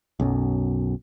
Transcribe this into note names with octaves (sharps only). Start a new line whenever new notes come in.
B1 F#2